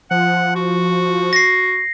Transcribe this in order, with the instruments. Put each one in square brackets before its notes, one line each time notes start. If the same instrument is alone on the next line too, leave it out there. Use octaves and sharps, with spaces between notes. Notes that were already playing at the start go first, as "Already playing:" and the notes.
[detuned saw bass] F3 [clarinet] F#5
[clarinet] F#4
[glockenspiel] A#6 C7